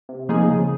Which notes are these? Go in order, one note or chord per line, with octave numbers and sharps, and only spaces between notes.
C3
F3 A#3 D#4 G#4
C#3